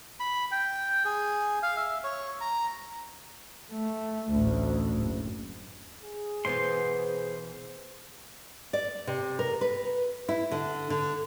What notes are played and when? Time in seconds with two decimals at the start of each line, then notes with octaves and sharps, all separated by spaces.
0.20 B5
0.52 G5
1.05 G#4
1.63 F5
1.77 E5
2.04 C#5
2.41 A#5
3.72 A3
4.31 A1 D2
4.99 F#1
6.03 G#4
6.45 B2 E3 B3 C5 C6
8.73 D5
9.07 C3
9.39 A#4
9.61 B4
10.29 E4
10.51 D3
10.90 D3